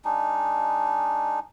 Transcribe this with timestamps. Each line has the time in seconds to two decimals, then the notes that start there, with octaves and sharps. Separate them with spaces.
0.05 G#3 D4 D#4